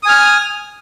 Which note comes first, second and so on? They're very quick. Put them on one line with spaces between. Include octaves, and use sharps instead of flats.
D#6 G#5 F6